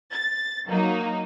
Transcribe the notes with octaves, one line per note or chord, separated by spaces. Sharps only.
A6
F#3 A#3 D#4